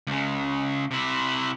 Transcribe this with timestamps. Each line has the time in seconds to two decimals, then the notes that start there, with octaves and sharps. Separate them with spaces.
0.07 C#2 C#3
0.91 C3 E4